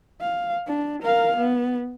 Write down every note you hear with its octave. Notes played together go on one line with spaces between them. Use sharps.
F5
D4
A#4 F5
B3